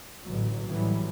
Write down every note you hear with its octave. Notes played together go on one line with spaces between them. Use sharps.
A1 D3 E3 F#3
A1 A2 E3 F#3 G3